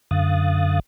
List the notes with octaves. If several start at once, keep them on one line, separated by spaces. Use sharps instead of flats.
F#2 D3 F5 D#6 F#6 A6